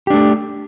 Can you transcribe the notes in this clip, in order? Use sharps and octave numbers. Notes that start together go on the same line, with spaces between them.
A3 D4 G4